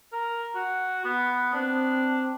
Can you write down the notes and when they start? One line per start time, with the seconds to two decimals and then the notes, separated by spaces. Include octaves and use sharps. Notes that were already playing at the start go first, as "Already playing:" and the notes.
0.13 A#4
0.55 F#4
1.05 B3
1.54 C4 D4